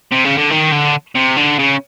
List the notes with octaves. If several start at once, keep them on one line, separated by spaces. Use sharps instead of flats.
C3
C#3
D3
D#3
D3
C3
D3
C#3